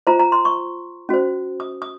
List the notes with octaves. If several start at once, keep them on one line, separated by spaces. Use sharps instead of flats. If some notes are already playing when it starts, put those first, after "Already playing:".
F4 C5 A#5
A#5
C6
C#6
C#4 F#4 C5
D#6
D#6